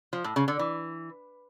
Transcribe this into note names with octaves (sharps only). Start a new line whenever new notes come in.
F3
A2
C#3
D3
E3